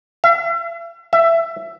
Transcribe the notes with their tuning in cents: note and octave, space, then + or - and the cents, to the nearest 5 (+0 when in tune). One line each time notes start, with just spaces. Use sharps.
E5 +40
E5 +15